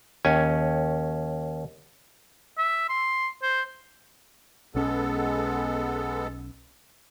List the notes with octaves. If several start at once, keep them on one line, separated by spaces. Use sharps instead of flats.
D#2 C#4 G#5
E5
C6
C5
B1 G#3 B3 C#4 A4